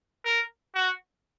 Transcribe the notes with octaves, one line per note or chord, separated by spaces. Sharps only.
A#4
F#4